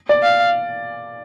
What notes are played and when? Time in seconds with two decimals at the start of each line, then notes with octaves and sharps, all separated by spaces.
0.09 D5
0.23 F5